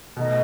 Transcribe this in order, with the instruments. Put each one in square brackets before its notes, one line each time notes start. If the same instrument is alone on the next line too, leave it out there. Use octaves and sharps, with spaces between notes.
[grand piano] B2 A3 D#4 [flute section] D#5